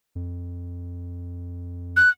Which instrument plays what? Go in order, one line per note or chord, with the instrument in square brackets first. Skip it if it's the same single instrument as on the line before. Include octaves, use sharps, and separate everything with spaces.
[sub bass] F2
[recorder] F#6